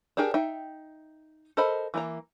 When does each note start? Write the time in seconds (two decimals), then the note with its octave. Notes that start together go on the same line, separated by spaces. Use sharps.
0.17 D4 G4 G#4 A#4 G5
0.34 D#4 E5 G5
1.57 A4 A#4 C5 D#5 B5
1.94 E3 A#3 A#5